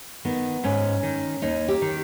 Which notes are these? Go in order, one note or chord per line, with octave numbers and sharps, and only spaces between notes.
D#3 B3
G#2 C#4
D#3
D#2 D#4
G4
D#3